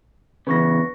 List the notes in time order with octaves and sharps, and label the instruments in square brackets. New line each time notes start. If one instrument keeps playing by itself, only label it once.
[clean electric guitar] E2 C#3 [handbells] B4 C#6 A#6